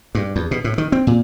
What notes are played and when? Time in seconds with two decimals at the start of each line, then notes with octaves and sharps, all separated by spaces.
0.15 G2
0.36 E2
0.51 B2
0.64 A2
0.78 D#3
0.92 C4
1.07 A#2